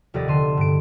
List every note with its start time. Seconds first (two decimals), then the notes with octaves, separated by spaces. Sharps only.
0.14 F1 D#2 G4 D5 D#5 A6
0.28 D3 A5 C6 C7 D#7
0.57 G2 D7